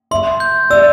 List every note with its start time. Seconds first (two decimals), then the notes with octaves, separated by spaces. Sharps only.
0.11 E5 C6
0.40 G6
0.70 D5 E6